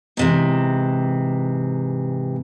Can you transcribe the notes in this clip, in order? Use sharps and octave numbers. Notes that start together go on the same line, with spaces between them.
G#2 C3 E3